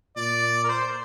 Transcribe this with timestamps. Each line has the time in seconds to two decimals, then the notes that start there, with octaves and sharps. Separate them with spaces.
0.16 A#2 D5
0.64 A#4
0.69 C5